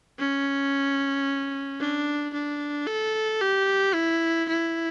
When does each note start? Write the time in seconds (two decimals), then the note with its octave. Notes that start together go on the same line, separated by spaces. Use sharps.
0.19 C#4
1.80 D4
2.34 D4
2.87 A4
3.42 G4
3.94 E4
4.49 E4